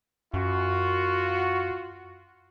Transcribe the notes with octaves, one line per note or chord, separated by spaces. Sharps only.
F#2 F4 F#4